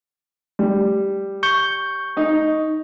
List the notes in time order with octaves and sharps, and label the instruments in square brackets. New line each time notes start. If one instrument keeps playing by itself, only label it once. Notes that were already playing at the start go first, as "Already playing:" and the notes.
[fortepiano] G3
[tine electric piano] C#6 G6
[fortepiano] D#4 D#5